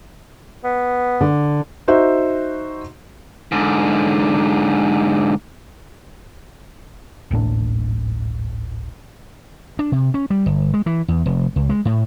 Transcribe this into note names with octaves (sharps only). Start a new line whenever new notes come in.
B3
D3
D#4 F#4 C5 E5
G#2 D3
D1 G#1 A2 D4
D4
C3
C#4
G3
G1
G#3
E3
E2
F1
C#2
G#3
A2